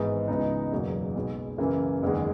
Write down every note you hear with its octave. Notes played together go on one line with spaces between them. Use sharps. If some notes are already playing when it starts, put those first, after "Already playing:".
Already playing: G#1 G#2 E3 G#3 B3
C#2 C#3 E3 B3 D#4
F#1 E2 B2 F#3 A#3
B1 B2 G#3 B3
F#2 C#3 E3 A#3
F#1 E2 D#3 G#3